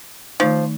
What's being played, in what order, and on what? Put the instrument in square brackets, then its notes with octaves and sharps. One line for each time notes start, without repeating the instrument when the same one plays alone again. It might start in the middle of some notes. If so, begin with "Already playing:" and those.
[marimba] D#3 A3 D#4 [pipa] F3